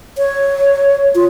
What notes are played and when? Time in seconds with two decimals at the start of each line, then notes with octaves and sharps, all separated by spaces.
0.18 C#5
1.15 F4